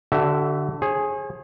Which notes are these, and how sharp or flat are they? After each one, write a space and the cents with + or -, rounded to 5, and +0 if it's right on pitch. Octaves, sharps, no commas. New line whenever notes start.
D3 +0 F#4 +45 E5 +0
G#4 +0 C#5 -45